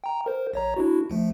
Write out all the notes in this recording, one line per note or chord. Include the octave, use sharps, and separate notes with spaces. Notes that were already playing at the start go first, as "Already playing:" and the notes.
G5 A#5
A#4 C5
A#1 C#5 A#5
D4 E4 F#4
D2 F3 A3